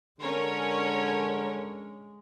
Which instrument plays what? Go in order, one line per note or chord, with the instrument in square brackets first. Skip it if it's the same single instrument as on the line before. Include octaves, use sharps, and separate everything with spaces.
[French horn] D3 [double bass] G#3 [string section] C#4 A#4 C#5